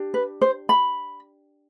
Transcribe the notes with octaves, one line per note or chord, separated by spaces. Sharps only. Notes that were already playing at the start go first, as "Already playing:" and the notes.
Already playing: D4 G4
B4
C5
B5